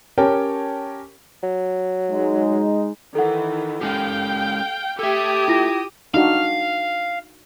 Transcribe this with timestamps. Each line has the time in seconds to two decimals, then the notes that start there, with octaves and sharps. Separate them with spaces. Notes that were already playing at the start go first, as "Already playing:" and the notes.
0.17 C#4 G4 A#4 C#5 G5 A5
1.43 F#3
2.11 G#3 D#4
3.15 D#3 E3 A4 F#5
3.81 G#3 C#4 G4 F5 G5
4.99 G4 A4 E5 D#6 G#6
5.48 E4 F4 A#6
6.14 D4 D#4 F#4 F5